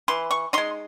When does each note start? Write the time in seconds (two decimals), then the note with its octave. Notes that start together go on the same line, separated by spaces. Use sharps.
0.08 E3 C6
0.31 C#6
0.53 G#3 D#4 C6